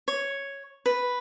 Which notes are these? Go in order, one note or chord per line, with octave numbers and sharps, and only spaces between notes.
C#5
B4